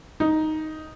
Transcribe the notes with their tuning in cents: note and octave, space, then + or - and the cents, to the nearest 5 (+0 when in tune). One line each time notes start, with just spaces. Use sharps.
D#4 +5